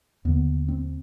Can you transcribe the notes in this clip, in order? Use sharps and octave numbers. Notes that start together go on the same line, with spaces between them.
D#2 D3 B3
C4